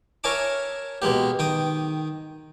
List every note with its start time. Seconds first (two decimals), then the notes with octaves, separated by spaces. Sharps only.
0.24 A#4 C#5 E5 G#5 A5 D6
1.02 B2 G#3 A#3 G4
1.39 D#3 G5 D#6